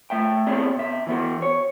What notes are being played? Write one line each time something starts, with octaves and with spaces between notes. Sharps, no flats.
A3 E5 G5
B3 C4 E4 G#4 C#5 D5
B2 E5
E3 B3 F#4
C#5